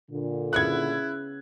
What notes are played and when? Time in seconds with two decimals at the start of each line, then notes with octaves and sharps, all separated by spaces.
0.11 A#2 D3
0.53 C#3 B3 E4 F#5 F#6 G#6